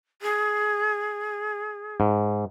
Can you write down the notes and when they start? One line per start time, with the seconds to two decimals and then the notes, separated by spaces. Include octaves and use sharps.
0.22 G#4
2.00 G#2